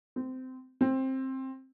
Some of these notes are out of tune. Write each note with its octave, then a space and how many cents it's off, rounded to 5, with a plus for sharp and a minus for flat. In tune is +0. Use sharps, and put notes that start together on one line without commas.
C4 -20
C4 +15